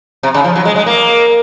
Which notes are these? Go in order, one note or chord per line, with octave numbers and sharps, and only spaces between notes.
C3
C#3
F3
F#3
G#3
G#3
A#3